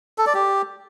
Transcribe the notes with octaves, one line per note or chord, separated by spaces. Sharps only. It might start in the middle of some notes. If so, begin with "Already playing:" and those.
A4
D5
G4